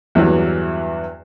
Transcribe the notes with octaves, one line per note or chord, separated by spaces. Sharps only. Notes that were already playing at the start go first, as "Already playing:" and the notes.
E2 G2 E3 F#3